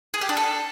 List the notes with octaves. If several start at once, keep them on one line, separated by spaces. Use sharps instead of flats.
G#4
G4
D4
A4